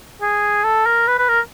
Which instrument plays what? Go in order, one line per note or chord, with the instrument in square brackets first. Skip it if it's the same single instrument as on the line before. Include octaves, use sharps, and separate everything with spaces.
[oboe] G#4
A4
A#4
B4
B4
A#4